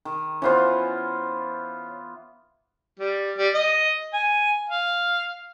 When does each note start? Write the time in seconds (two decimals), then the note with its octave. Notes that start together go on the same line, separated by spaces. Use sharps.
0.05 D#3
0.42 E3 B3 C#4 F4 C5
3.00 G3
3.38 G3
3.55 D#5
4.13 G#5
4.69 F5